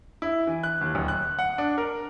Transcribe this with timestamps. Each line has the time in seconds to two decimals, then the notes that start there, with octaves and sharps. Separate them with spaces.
0.22 E4
0.47 E3
0.63 F#6
0.81 D#2
0.95 D1
1.08 F#6
1.39 F#5
1.58 D4
1.78 A#4